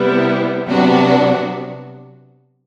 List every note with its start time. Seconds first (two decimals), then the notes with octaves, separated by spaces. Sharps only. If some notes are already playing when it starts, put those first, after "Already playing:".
Already playing: C3 G3 B3 E4
0.68 C3 F#3 B3 D4 F#4